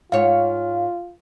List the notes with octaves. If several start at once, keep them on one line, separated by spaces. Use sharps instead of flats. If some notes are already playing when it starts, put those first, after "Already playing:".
G#2 F4 C#5 F5